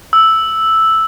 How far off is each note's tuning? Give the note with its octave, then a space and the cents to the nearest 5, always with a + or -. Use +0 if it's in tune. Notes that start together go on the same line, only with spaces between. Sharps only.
E6 -5